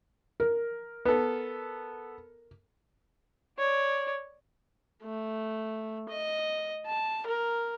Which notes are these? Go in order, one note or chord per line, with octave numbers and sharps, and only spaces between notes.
A#4
B3 A4
C#5 D5
A3
D#5
A5
A#4